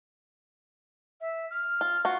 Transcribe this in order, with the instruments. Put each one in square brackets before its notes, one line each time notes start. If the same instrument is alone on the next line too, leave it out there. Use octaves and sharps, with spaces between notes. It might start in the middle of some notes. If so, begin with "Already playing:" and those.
[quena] E5
F6
[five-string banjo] F4
[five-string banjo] F4 F#4 [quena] C#6